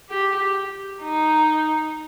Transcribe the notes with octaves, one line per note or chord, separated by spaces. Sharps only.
G4
D#4